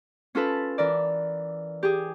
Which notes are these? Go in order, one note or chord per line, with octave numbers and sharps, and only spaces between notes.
C#4 F4 A4 B4
E3 A#4 D5
G4 G#4